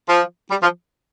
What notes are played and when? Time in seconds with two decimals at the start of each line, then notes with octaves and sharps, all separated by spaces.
0.08 F3
0.50 G3
0.62 F3